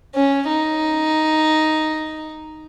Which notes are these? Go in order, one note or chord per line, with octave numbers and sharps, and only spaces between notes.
C#4
D#4